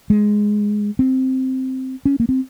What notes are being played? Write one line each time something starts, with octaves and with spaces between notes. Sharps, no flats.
G#3
C4
C#4
A#3
C4